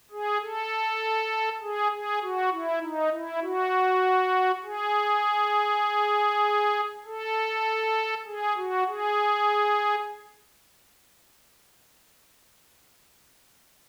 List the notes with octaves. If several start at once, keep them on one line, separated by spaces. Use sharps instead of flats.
G#4
A4
G#4
G#4
F#4
E4
D#4
E4
F#4
G#4
A4
G#4
F#4
G#4